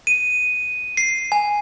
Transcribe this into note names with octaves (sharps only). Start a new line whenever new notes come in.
D#7
C7
G#5